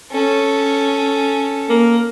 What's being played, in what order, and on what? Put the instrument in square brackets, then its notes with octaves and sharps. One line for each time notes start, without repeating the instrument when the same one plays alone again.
[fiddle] C#4 A4
[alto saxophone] A#3